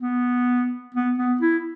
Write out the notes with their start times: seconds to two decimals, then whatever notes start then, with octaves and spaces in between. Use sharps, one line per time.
0.01 B3
0.94 B3
1.18 B3
1.41 E4